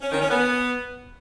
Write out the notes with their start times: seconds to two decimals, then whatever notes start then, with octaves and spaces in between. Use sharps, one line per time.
0.01 C#4
0.11 D#3
0.20 C#4
0.29 B3